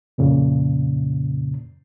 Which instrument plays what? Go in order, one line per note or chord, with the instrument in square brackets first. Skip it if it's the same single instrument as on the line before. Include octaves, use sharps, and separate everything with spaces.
[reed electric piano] F2 A#2 C#3